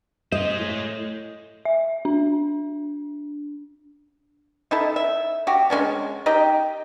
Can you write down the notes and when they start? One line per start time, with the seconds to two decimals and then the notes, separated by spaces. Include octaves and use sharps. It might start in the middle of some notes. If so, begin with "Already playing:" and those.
0.32 G#3 C5 D#5
0.59 A2
1.65 E5
2.05 D4
4.71 D#4 E4 A4
4.96 E5
5.47 F#4 G4
5.70 G#3 B3 C#4 D4
6.26 D#4 G4 D#5 G5